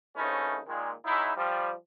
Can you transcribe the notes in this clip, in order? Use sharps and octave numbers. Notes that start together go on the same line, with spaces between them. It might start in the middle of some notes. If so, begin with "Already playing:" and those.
C2 C#3 A3 C#4 D#4 B4
A#2 D#3 G#3
F#3 G#3 D#4 E4
F3 G3